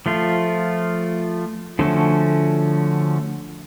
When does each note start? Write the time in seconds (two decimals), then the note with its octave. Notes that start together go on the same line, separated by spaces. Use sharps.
0.06 F3 A3 F4
1.79 D3 F3 A3 C#4 F#4